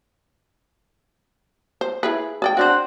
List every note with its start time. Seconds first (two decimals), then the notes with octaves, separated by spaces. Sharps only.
1.81 C5
2.03 E4 G#4 B4
2.42 G#4 D5 G5
2.57 C4 D4 F#4 C5 F#5